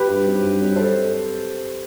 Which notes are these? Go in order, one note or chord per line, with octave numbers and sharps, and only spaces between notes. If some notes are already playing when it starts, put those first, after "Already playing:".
Already playing: G4 B4
G2
F#3 C4 D#4
G2
F#3 C4 D#4
A4 C5